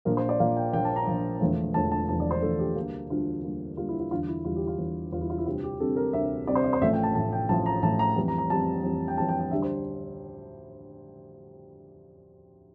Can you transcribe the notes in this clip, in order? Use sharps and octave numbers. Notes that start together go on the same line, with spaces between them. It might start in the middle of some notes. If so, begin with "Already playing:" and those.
A#1 A#2 F3 A#3 A#4
C5
D5
A#1 A#2 F3 A#3 F5
G5
A#1 A#2 F3 A#3 G5
A5
A#5
A#1 A#2 F3 A#3
E1 E2 D3 F3 A3
E1 E2 D3 F3 A3 A5
A5
E1 E2 D3 F3 A3 A5
D5
C5
E1 E2 D3 F3 A3 A4
G4
D2 D3 G3 A#3
D2 D3 G3 A#3 F4
D2 D3 G3 A#3
D2 D3 G3 A#3 F4
E4
F4
E2 D3 G3 F4
E4
E2 D3 G3 F4
G4
F4
E2 D3 G3
E2 D3 G3 F4
E4
F4
E4
D2 C3 G3 C4 F4
G4
D2 C3 G3 C4 A4
A#4
D2 C3 G3 C4 E5
D2 C3 G3 C4 D5
C5
D5
C5
A1 A2 F3 A3 E5
G5
A5
A1 A2 F3 A3 A5
G5
A1 A2 F3 A3 A5
A#5
A1 A2 F3 A3 A5
A#5
F2 E3 G3 C4
A#5
A#5
F2 E3 G3 C4 A5
F2 E3 G3 C4
G5
F2 E3 G3 C4 A5
G5
G5
D2 D3 G3 E5
C5